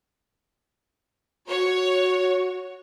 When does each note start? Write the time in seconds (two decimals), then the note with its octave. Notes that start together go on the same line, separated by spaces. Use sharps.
1.48 F#4 C#5